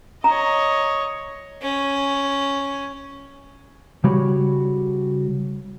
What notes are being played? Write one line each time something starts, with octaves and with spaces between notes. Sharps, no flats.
C#5 D#5 A#5
C#4
C#3 G3 F#4 C#5 B5